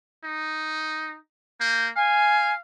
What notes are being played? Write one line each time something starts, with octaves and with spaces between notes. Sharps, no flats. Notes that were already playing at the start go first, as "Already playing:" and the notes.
D#4
A#3 G6
F5 G#5